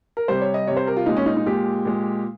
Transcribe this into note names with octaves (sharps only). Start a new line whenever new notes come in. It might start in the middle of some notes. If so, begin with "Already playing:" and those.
A#4
C3 G3 C5
C#5
D#5
C3 G3 C#5
C5
A#4
F4
A#2 G#3 D#4
C#4
D#4
D#4
A#2 G#3 G4
A#2 G#3